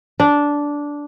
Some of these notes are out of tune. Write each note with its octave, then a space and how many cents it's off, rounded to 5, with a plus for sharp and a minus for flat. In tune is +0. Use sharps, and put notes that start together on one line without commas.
D4 -10